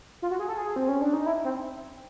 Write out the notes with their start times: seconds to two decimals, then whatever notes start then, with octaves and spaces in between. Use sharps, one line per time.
0.22 F4
0.31 F#4
0.39 G#4
0.48 A4
0.57 G#4
0.76 C4
0.89 C#4
1.02 D4
1.14 D#4
1.26 E4
1.44 C4